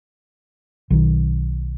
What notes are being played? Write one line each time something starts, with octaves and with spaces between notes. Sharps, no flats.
B1 D#3